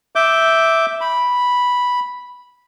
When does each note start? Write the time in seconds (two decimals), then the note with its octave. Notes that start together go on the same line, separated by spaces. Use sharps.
0.15 E5 D6 G6
1.01 B5